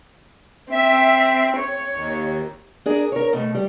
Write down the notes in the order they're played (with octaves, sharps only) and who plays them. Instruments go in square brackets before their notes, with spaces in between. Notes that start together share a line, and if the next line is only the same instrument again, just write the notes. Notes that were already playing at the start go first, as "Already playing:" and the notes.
[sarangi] C4 [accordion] E5
[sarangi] C#5
[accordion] D#2
[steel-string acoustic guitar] D4 G#4 A#4
A#4 C#5
B2 A3
G3